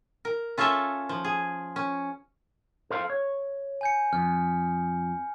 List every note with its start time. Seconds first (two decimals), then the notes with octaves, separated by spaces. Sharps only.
0.25 A#4
0.58 C#4 F4 A4 C#5 E5 A5
1.09 F3
1.25 G#4
1.76 C#4
2.90 A4 C5 F5
3.10 C#5
3.81 G#5 G6 C#7
4.13 F2 F6